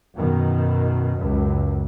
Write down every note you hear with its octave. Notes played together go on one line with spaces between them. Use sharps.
F#2 B2 D#3
C#2 F#2